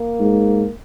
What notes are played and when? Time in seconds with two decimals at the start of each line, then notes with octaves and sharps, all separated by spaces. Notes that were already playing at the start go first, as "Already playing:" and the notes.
Already playing: A#3
0.20 G#2